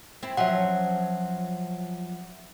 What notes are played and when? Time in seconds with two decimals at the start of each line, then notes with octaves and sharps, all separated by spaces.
0.23 C4 E4
0.37 F3 F#3 C#4 E5 F#5